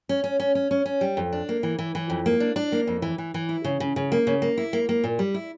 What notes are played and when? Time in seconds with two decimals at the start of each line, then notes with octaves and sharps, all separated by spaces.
0.09 C#4
0.24 C#4
0.40 C#4
0.55 C#4
0.71 C#4
0.86 C#4
1.01 G3
1.17 F2
1.33 D4
1.49 A#3
1.63 E3
1.79 E3
1.95 E3
2.10 F2
2.26 A#3
2.40 D4
2.56 D4
2.72 A#3
2.87 F2
3.02 E3
3.18 E3
3.34 E3
3.49 E4
3.64 C#3
3.80 C#3
3.96 C#3
4.12 A#3
4.27 C#3
4.42 A#3
4.58 E4
4.73 A#3
4.89 A#3
5.04 A#2
5.19 G3
5.34 E4